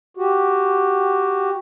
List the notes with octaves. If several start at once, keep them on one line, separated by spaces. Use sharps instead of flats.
F#4 G4